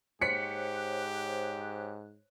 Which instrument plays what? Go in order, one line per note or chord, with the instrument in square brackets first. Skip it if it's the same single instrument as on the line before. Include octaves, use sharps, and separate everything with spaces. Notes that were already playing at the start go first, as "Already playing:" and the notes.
[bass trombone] G#2 [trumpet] G4 [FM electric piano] C5 C#5 F#6 [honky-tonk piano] B6 C#7